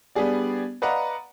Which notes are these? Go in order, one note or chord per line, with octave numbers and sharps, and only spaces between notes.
G3 B3 D4 G#4 D5
B4 D5 D#5 F5 F#5 A#5